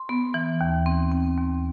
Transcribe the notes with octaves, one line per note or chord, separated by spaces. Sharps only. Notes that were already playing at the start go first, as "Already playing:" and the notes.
Already playing: C6
B3
E3
D#2
C4
C4
D#2